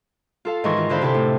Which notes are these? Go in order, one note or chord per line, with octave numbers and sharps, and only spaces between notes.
F4 A4 F5
G#2 D#3 E3 D#5 C6 C#6
F4
D3 D4 E4 C5 F5 B5
C3 E4 A4 C5
A2